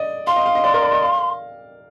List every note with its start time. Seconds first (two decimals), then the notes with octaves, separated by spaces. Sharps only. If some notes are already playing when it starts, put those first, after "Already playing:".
Already playing: D5 D#5
0.27 F5 C6
0.36 D#5
0.46 F5
0.55 D#5
0.64 D5
0.74 A#4
0.82 D5
0.92 D#5
1.02 F5